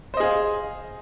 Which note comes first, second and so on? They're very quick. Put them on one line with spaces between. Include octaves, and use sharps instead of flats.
C5 D#5 G#4 F5